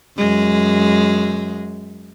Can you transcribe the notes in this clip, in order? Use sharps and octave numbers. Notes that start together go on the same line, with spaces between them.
F#2 G#3